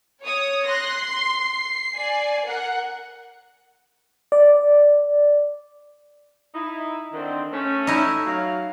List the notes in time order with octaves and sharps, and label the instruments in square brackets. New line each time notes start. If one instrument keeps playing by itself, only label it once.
[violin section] C#5 D#6
[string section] C6 [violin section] F#6 A#6
[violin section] C7
[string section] D5 G#5
A#4 F#5
[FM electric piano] D5
[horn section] D#4 E4
D3 D#3 C4
A3 C#4
[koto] D#4 E4
[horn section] F#3 F5